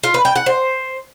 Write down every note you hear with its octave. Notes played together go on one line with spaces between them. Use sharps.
F4
B4
G5
F#5
C5